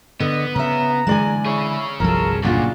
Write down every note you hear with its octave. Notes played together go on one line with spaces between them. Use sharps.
D3 B3 D#5
C#3 C#4 E5 A#5
D3 E3 G#3 D5 G#5
E4 G#4 C#5
G1 C2 F3 F#3 A4 A#4
A#2 C#3 D4 F4 F#4